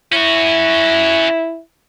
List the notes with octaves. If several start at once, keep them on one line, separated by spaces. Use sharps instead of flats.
C#4 E4 F#4